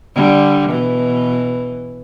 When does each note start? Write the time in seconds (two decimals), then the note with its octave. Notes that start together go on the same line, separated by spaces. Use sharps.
0.15 D3 G3
0.69 B2 E3